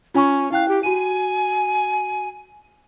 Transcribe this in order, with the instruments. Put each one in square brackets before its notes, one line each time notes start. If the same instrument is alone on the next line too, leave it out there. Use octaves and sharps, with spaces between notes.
[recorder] C#4 [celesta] F4 G#5 C#6
[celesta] E4 G5 F#6 [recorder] F5
[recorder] G4
[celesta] F#4 D#7 [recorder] G#5